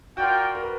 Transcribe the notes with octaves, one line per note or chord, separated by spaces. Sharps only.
F4 F#4 A#4 D5 G5
A#4
B4